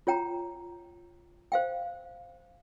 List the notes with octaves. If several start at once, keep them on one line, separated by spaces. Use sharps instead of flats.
F4 C#5 G5 A#5
C5 F5 G5